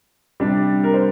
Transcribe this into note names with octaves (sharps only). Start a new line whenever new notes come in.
C3 G3 D4
A#4
C5